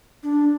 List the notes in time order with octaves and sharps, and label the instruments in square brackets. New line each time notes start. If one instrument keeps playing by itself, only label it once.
[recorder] D4